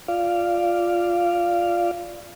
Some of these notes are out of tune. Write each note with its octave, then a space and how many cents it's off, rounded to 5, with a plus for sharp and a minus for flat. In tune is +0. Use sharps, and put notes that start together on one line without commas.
F4 +0 D5 +0 F5 -10